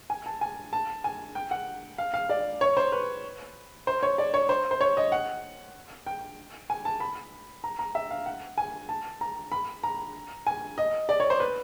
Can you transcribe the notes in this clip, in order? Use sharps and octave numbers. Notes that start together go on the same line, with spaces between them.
G#5
A5
G#5
A5
G#5
G5
F#5
F5
F5
D5
C#5
C5
B4
C5
C#5
D5
C#5
C5
C5
C#5
D#5
F#5
G5
G#5
A5
B5
A#5
A#5
E5
F5
F#5
G#5
A5
A#5
B5
A#5
G#5
D#5
D5
C#5
C5
B4